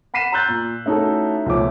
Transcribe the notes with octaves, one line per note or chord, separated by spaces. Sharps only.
F#5 B5 B6 C7 D#7 E7
A#5 C6 E6 F#6 G6 A6
A#2
A3 C#4 D#4 E4 F#4 A4
C#2 B2 F3 A3 C#4 D6